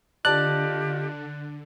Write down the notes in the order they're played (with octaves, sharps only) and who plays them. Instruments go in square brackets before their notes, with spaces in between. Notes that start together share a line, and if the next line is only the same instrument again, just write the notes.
[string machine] D3 [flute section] F4 G4 D#5 [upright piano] D5 A5 [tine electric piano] F#6